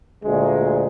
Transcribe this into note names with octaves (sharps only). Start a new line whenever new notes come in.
D2 A#2 G#3